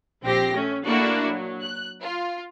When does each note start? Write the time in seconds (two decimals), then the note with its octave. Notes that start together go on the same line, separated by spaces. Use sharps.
0.25 A#1 C4 G4 G5 A#6 C7
0.54 A3 C#4
0.86 A3 A#3 D4 E4 F#4
1.30 F#3
1.62 F#6
2.02 F4